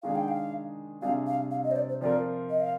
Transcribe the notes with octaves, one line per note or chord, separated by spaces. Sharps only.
D#3 G#3 D4 G#4 F5
G5
F5
C3 G3 D4 G#4 F5
F5
F5
D#5
C5
D5
C5
F3 C4 F4 A#4 D5
D#5
F5